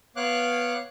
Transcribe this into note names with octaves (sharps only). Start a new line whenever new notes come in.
B3 C#5 F5 D6 F#6